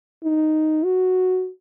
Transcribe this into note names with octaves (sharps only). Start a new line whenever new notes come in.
D#4
F#4